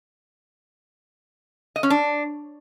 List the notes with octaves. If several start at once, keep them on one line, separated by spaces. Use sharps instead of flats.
D#5
C#4
D4